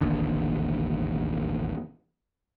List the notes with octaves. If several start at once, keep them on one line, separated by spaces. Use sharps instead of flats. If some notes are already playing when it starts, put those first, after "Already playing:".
E1 A1 D#2 D3